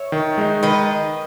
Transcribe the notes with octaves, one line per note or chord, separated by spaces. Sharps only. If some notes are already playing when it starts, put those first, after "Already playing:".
Already playing: C#5 E5
D#3
G#3 D#4
D#3 B4 D#5